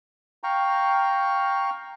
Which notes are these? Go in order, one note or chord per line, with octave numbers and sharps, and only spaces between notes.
F5 G5 A#5 C#6